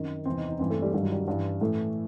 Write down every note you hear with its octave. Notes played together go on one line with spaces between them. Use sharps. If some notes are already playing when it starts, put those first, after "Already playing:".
Already playing: F#2 D#3 C4
E2 C3 E3 C4
D#4
D#4
G2 E3 C4
A3
G3
G2 D#3 G3
F#3
G3
G2 E3
A2 E3 A3